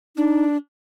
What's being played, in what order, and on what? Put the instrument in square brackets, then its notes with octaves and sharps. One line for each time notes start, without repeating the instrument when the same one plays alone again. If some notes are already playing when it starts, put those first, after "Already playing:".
[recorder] D4 [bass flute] D#4